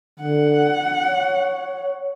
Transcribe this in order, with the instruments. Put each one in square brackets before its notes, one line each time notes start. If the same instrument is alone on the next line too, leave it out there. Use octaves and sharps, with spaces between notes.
[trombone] D3 [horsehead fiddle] F#5
[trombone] C#5